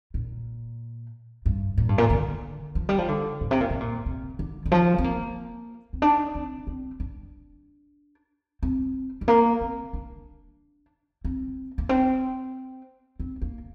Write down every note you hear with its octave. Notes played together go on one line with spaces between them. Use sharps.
A#2
G2
A#2
G2
A#2
D3
F3
G3
F3
D3
A#2
C3
A#2
C3
A#2
C3
D3
D3
F3
C4
A#3
C4
D4
C4
C4
D4
C4
G3
A#3
C4
D4
C4
A#3
C4
C4
A#3